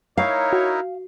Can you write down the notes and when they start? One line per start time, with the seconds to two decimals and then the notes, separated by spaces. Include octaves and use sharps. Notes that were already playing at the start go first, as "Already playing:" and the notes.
0.17 D#4 E4 A#4 C#5 F5
0.53 F#4